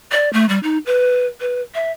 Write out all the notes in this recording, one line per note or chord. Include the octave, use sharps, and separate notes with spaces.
D5
A3
G3
D#4
B4
B4
E5